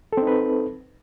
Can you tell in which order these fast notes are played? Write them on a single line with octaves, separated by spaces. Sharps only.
A4 C4 D#4 B4